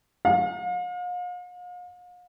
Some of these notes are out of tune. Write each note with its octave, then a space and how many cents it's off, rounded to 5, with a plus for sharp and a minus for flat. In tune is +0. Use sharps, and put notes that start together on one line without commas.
F5 +40